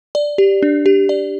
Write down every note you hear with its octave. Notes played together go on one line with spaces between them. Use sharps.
D5
G4
D4
G4
D5